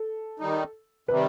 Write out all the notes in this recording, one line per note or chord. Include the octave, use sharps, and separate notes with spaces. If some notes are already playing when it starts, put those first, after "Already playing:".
Already playing: A4
D#3 G3 D#4
C3 D#3 G3 B4